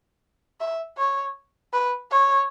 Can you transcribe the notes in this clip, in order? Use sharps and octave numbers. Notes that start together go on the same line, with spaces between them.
E5
C#5
B4
C#5